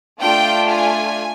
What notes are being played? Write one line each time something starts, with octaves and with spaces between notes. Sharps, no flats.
A3 D4 F4 G5
G#5